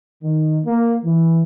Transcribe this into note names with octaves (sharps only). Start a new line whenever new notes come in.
D#3
A#3
E3